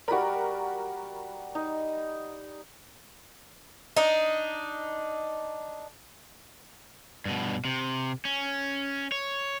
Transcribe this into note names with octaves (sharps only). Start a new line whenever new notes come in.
G3 F#4 A#4 B5
D#4
D4 D#4
G2 B2
C3
C#4
C#5